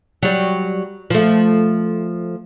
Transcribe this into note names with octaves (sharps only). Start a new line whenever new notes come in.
F#3 G3
F3 A3